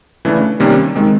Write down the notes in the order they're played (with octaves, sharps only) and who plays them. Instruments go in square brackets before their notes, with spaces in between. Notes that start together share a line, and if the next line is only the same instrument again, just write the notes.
[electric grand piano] C#3 E3 A3 D4
C3 D#3 G3 A#3 C#4
D#3 G#3 C4